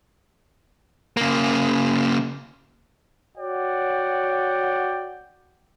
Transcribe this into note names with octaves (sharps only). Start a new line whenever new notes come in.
C#3 A#3
F#4 C#5 D5 F#5 G5